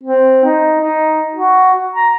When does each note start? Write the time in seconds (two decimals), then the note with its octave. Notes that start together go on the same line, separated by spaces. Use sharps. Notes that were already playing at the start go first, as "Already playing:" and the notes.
0.03 C4
0.44 D#4
0.81 D#4
1.35 F#4
1.94 A#5